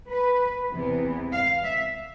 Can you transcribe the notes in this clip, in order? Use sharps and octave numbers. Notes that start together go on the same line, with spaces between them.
B4
E2 C3 E3 B3
F5
E5